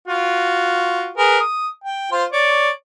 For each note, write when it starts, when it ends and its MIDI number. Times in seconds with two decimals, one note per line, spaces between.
0.08 1.09 65
0.08 1.09 66
1.18 1.38 68
1.18 1.38 70
1.18 1.38 71
1.40 1.69 87
1.84 2.07 79
2.12 2.25 65
2.12 2.25 72
2.12 2.25 84
2.32 2.69 73
2.32 2.69 74